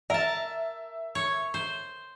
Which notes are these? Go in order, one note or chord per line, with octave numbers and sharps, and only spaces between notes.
A#4 E5 A5
C#5
C5